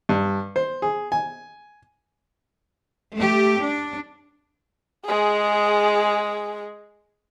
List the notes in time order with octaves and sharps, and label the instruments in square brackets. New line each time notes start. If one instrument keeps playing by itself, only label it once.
[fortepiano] G2
C5
G#4
G#5
[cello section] A3 G4
D4
[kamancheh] G#3 G#4